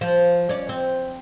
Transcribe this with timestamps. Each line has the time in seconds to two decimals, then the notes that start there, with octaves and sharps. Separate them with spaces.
0.01 F3
0.49 C#4 D5
0.69 C4